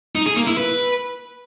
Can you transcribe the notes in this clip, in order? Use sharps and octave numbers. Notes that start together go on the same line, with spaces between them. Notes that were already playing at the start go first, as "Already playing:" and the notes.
D#4
G#4
A#3
E4
B4